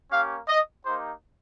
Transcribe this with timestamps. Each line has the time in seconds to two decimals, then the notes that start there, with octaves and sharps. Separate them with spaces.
0.10 A#3 C#4 G4 F5
0.48 D#5
0.84 A#3 D#4 G4 C5